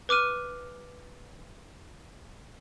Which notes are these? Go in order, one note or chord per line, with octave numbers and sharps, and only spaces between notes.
B4 D6 F6 D#7